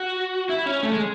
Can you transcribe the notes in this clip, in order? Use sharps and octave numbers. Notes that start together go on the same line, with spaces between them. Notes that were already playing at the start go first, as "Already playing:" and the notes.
Already playing: F#4
E4
C#4
A3
G#3